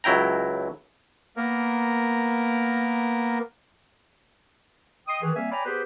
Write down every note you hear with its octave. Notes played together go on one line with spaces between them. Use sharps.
C#2 F#3 E4 G5 A#5
A#3 B3 A#4
D#5 G5 C6 D#6
D#3 E3 G#4
G3 A#3 C4 E5 F5 G#5
C#5 D5 G5 G#5 A#5 B5
B3 G4 G#4 B4 C5